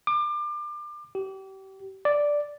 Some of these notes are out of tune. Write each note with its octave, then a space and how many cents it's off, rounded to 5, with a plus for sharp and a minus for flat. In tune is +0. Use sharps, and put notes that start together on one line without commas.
D6 +30
G4 -35
D5 -5